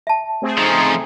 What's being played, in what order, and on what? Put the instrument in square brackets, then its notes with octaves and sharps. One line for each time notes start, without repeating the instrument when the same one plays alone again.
[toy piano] E5 A5
[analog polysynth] A3 C4 G#4
[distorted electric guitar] C#3 F3 [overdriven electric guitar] D#4